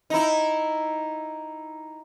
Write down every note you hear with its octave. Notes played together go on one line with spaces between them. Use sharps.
D#4 E4